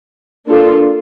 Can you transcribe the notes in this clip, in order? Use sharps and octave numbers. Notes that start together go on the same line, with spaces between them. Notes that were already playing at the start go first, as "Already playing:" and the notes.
A#3 D4 F4 A4